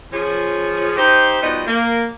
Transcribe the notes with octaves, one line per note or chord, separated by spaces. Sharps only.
F3 C#4 G#4
D#4 G4 C5
B2 F3 G3 B3 D#4 D#5
A#3